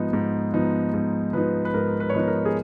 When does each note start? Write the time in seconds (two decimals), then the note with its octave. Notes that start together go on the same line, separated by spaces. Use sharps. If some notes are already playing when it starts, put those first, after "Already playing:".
Already playing: G#2 F3 B3 D#4
0.13 G#2
0.54 F3 B3 D#4
0.94 G#2
1.33 F3 B3 D#4 B4
1.65 B4
1.74 G#2 A#4
2.00 B4
2.09 C#5
2.14 F3 B3 D#4 B4
2.28 A#4
2.45 G#4